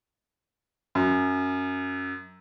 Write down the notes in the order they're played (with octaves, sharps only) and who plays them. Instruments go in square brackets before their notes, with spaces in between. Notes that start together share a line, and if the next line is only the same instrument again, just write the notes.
[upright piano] F#2